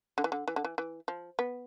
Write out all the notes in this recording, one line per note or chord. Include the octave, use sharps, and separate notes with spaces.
D3
E3
D3
E3
D3
E3
E3
F3
B3